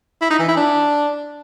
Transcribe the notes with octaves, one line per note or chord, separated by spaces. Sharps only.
E4
D#4
E3
E4
D4